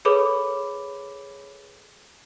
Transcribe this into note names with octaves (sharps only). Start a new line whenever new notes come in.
G#4 A4 B4 C#5 B5 D6